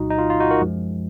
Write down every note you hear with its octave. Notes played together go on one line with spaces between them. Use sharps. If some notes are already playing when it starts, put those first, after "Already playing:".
Already playing: C2 A#2 F#3 D#4 F#4
D#4
F4
F4
D#4 F#4
F#4 A#4
F#2 F3 G#3